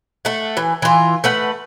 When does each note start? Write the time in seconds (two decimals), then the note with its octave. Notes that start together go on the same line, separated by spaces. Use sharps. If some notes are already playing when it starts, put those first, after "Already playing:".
0.25 A3 F#5
0.57 E3
0.82 E3 F4
1.24 A3 B4 F#5